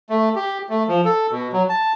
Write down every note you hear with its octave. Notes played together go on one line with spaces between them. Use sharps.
A3
G4
A3
F3
A4
B2
F#3
A5